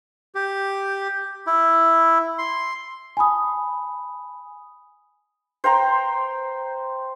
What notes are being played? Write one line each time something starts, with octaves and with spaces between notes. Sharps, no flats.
G4
E4
C6
G#5 A5 B5 D#6
C5 G5 A#5 C6